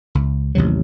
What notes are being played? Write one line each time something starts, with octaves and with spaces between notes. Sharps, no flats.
C#2
A1 D#2 C3 F#3